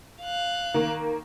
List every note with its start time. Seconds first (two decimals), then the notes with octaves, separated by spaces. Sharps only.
0.22 F5 F#6
0.74 D#3 A#3